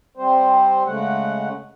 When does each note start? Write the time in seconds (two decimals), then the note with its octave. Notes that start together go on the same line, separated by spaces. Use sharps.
0.17 G3 C4 C5
0.86 C#3 G#3 A3 F#5